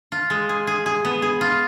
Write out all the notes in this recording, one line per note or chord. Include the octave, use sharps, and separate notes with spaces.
F4
G#3
G#4
G#4
G#4
B3
G#4
F4